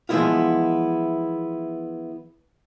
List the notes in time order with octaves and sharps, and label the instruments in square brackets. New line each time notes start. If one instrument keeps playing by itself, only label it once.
[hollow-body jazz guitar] E3 F3 G#3 B3 E4 F4